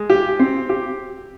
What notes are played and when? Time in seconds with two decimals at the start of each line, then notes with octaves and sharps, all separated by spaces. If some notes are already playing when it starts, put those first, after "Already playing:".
Already playing: G#3
0.10 G4
0.39 C4
0.69 G4